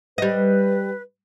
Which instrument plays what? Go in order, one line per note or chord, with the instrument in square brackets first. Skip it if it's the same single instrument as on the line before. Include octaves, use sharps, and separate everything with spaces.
[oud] G3 D#5 [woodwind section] B4